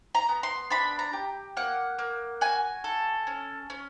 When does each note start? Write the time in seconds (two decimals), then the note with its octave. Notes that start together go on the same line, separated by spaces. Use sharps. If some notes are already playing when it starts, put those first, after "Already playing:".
0.15 A#5
0.29 B3
0.43 C6
0.70 D4 B5
0.99 A#5
1.13 G4
1.57 A#3 F#5
1.99 A#3
2.41 F#4 G#5
2.84 A4
3.27 C#4
3.70 C#4